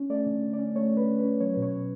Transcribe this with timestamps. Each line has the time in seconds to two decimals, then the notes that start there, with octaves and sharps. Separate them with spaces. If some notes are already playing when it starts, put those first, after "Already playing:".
Already playing: C#4
0.10 A3 D5
0.26 D3
0.43 D3
0.53 D5
0.59 C#4
0.75 A3 C#5
0.91 D3
0.97 B4
1.07 D3
1.19 B4
1.24 C#4
1.40 F#3 C#5
1.54 B2 B4
1.62 C#5
1.73 B2